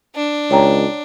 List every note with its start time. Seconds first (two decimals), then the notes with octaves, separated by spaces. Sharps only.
0.15 D4
0.51 C#2 C#5 G5 A#5